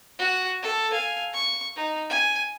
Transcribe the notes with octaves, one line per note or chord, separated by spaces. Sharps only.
F#4
A4
F5 G#5
C#6
D#4
G#5